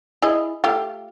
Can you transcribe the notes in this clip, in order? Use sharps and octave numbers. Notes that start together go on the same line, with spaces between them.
E4 G#4 D#5
A3 F4 G4